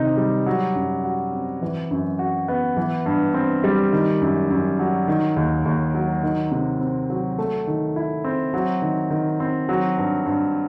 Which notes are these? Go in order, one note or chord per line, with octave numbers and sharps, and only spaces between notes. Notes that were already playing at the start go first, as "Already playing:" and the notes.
Already playing: C3 D#3 D#4
G3
F#3
F#2
F#4
C4
E3
F#2
F#4
B3
E3
G2
C4
G3
D#3
F#2
F#2
F#3
D#3
D#2
D#2
F#3
D#3
C3
C4
F#3
A3
D#3
E4
C4
F#3
D#3
D#3
C4
F#3
G2
G2